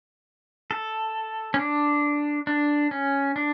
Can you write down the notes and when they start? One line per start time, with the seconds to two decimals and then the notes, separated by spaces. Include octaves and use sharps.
0.71 A4
1.54 C#4
1.59 D4
2.47 D4
2.91 C#4
3.36 D4